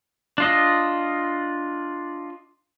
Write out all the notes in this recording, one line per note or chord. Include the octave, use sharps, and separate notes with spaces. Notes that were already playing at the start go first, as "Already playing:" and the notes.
D4 F4 D#5